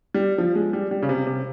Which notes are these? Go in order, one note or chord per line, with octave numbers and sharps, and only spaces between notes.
G3
F3
G#3
G3
G3
C#3
C3
C3